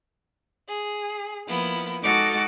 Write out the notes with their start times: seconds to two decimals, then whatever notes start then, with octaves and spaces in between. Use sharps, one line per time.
0.68 G#4
1.47 F3 A#3 B3 E4
2.03 G#3 D#4 F#4 A4 D6 A6